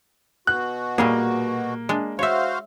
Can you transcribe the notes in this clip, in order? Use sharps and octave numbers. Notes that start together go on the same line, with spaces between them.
B2 F#4 F#6
A#2 G3 A#3 G#4
G#3 D4
F#4 C5 C#5 E5 F5